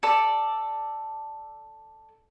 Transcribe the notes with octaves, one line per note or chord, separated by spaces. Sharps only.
A4 D5